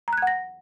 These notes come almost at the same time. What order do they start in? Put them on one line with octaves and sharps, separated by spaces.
A#5 F#6 G#6 F#5 A#6